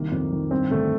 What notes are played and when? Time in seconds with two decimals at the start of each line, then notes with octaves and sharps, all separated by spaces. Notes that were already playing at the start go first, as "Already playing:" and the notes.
Already playing: C2 D#3 A#3
0.12 F2
0.32 D#3
0.51 G2 C4
0.71 D3 A3